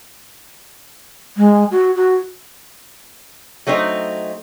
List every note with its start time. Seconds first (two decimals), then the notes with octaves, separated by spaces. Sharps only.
1.37 G#3
1.71 F#4
1.95 F#4
3.67 F#3 A3 C4 D#4